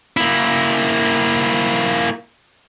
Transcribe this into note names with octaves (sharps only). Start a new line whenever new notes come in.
A#3 E4